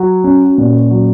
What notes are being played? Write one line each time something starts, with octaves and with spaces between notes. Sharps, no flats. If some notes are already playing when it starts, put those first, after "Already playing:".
Already playing: F#3 F#4
C#4
A#2
F#3